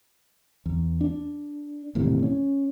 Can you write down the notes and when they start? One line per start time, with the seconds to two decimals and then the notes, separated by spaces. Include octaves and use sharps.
0.66 E2
1.01 D4
1.95 E1 D#2 A2 C3
2.23 C#4